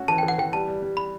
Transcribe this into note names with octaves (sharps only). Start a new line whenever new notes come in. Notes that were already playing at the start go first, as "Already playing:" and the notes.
Already playing: A3 C#4 F#4
E3 A5
E3 G5
F#5
E3 G5
G3 A5
G3
G3
G3 B5